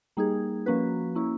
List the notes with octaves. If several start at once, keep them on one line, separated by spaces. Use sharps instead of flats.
G3 A#3 D#4 G#4
F3 A#3 C#4 F#4 B4
A#3 C#4 E4